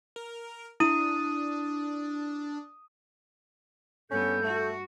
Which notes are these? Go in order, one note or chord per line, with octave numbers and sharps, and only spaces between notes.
A#4
D4 E4 D#6 D#7
G2 B3 C#4 A4 G6
A3 F#4